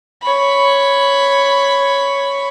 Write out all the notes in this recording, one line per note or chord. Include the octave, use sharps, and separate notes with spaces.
C#5 B5